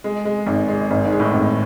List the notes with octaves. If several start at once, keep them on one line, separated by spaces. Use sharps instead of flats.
G#3
G#3
G#1
G#3
G#1 G#2
G#2
G#3
A2
G#1